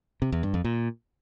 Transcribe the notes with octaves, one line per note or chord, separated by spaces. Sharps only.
C3
E2
G2
F2
A#2